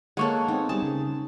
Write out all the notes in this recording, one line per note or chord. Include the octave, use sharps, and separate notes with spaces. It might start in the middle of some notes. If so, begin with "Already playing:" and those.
G#3 A#3 A4 C#5 F#5
B3 C4 D#4
G3 C4 G#4 A5
C#3